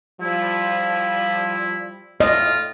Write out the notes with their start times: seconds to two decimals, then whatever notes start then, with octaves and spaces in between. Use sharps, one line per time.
0.21 F3 G3 E4
2.20 A2 A3 F4 D#5